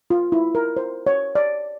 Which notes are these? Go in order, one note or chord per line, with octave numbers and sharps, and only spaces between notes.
F4
E4
A#4
C5
C#5
D5